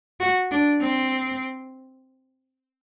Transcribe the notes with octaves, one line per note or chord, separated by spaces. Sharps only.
F#4
D4
C4